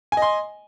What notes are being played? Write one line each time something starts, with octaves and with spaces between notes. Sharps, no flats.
D#5 G#5 C6